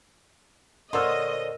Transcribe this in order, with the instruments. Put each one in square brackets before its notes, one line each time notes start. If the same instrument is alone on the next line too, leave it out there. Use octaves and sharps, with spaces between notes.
[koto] A#2 [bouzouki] D3 C5 C#5 [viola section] D#5 [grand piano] C6 E6 F6